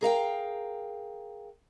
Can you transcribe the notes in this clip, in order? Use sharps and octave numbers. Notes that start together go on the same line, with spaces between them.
G#4 A#4 F5 G5